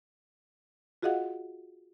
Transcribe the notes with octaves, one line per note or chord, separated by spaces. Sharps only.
F4 F#4 G#4 D#5 F5 F#5